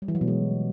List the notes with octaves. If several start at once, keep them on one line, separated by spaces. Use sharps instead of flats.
G3
E3
F#3
B2
G#3